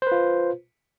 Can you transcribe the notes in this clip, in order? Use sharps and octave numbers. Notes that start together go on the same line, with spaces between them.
F4 B4 C5